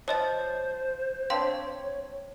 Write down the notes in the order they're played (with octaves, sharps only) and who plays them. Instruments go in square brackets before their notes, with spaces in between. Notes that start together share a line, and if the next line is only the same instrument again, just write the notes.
[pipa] F3 [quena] C5 [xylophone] C#5 D#5 A6
[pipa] C4 D4 [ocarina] C#5 [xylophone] F5 C6